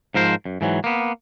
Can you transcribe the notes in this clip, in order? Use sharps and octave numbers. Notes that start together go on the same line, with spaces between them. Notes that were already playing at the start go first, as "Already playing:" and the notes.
G#2 F3 A#4 C5
F#2
G#2 E3 F#3
A#3 B3